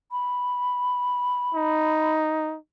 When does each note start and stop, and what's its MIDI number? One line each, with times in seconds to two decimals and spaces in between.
0.12 2.15 83
1.55 2.56 63